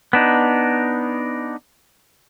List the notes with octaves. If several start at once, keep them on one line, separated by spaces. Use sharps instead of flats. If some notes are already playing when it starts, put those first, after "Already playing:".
B3 D4 D#4